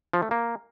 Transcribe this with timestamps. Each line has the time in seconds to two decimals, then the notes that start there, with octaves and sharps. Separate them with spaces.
0.13 F3
0.22 A3
0.31 A#3